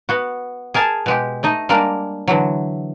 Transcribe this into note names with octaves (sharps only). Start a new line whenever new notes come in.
B3 F#4
G#4 A#4 G#5 A5
B2 G#3 G4
A3 D#4 D#5
G3 G#3 A#3 D4 A#4
D3 E3 F#3